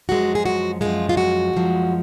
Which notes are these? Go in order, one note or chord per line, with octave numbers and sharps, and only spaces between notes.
F#2 F3 G#3 F#4
G#4
F#4
F#2 F3 G#3 F4
F4
F#4
F#2 F3 G#3